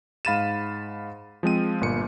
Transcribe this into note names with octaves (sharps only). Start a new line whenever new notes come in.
G#2 F5 B5 A6 D#7 E7
F3 G#3 C4 D#7
G1 A#2 C#7